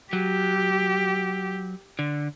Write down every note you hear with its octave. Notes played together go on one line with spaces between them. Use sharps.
F#3 G4
D3